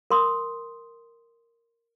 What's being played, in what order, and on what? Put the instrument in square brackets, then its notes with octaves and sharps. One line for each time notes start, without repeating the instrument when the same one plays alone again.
[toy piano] A#4 C6 D#6